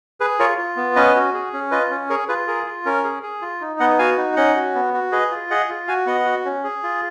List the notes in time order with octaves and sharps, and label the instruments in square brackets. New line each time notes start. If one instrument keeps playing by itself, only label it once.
[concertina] G#4 B4
F4 A#4 C#5
F4
B3
C#4 B4 D#5
F#4
G#4
C#4
F4 B4 D#5
C#4
G#4 A#4 C#5
F4 G#4 B4
G#4 A#4
F4
C#4 A#4
G#4
G#4
F4
D#4
B3 D#5 F#5
F#4 F5 G#5
D#4
C#4 D#5 F#5
F#4
B3
F#4
G#4 B4 D#5
F4
G#4 D#5 F#5
F4
F#4 F5 G#5
B3 D#5 F#5
F#4
C#4
G#4
F4